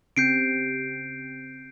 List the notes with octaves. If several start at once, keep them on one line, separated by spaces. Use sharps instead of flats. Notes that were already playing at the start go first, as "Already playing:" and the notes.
C#3 C4 G4 G6 C7 D7